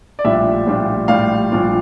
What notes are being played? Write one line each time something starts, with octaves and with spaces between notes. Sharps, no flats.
D5
A#1 A2 G3 D4 F4 E5
A#1 A2 G3 D4 F4
A#1 A2 G3 D4 F4 F5
A#1 A2 G3 D4 F4